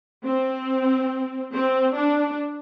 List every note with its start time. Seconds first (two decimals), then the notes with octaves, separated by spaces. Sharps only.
0.25 C4
1.53 C4
1.96 D4